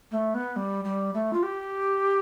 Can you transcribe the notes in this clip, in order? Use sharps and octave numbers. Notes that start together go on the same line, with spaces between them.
A3
B3
G3
G3
A3
F4
G4